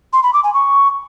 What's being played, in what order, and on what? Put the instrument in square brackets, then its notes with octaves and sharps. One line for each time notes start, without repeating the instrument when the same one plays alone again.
[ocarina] C6
B5
D6
G#5
C#6